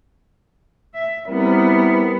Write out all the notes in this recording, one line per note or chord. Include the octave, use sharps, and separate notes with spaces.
E5
G3 B3 C4 E4 A#4